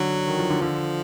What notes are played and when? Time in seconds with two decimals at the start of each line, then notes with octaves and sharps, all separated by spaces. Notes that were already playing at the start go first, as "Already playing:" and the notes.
Already playing: D3 F#3
0.27 D#3
0.39 F3
0.50 D3
0.61 D3 F3